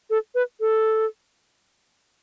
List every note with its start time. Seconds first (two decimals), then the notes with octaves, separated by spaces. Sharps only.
0.10 A4
0.35 B4
0.60 A4